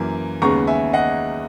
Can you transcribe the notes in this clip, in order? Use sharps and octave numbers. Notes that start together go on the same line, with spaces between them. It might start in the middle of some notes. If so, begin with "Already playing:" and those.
Already playing: F#2 E3 A#3
D#2 C#3 G#3 B3 A#5 C#6
E5 G#5
D#5 F#5